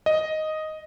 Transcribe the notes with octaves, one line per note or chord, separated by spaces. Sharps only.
D#5